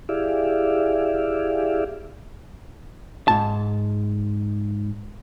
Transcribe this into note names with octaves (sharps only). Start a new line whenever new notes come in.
E4 G4 G#4 D5 E5 F5
G#2 A5